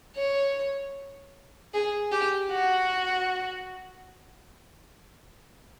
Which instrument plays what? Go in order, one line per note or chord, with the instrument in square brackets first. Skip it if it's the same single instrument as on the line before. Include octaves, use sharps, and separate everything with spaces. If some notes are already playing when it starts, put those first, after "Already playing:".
[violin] C#5
G#4
G4
F#4